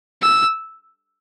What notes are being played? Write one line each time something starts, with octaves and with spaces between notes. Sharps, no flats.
E6